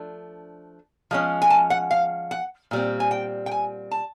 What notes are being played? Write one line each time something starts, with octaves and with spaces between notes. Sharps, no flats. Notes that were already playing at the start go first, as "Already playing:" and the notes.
Already playing: F3 A3 D4
F3 G#3 C#4
G#5
A5
F#5
F5
F#5
A#2 G3 C4
G#5
G5
G5
G#5
A5